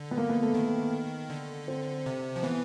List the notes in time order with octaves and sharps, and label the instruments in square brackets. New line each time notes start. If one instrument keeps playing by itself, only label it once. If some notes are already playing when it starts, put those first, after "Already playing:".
Already playing: [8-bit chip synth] D3
[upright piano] B3
A#3
B3
A3
[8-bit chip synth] D#3
D3
[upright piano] C4
[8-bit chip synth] C3
F3
[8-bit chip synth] E3 [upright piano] B3